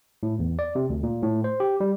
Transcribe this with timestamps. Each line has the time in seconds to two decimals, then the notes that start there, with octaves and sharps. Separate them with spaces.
0.23 A2
0.39 E2
0.59 D5
0.75 C3
0.90 D2
1.03 A#2
1.23 A2
1.44 C5
1.60 G4
1.80 G3